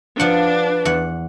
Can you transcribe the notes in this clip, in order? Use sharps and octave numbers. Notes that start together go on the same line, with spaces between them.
F3 D4 B4 F#5
E2 F#5